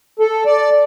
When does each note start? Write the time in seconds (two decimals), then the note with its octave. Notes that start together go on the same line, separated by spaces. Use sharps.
0.19 A4
0.46 D5